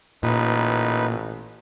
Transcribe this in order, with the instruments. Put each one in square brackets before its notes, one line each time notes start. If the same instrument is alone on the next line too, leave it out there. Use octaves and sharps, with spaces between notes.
[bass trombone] A1 [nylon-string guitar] A#2 [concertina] D#4 B4